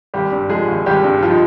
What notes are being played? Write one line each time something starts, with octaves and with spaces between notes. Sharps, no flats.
G#1 G3 G4
G2
F3 G#3 G#4
G#1
G#1 G3 G4
G2
F3 F4
D#4